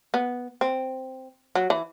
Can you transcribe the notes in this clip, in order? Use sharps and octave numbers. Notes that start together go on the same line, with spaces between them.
B3
C4
F#3
E3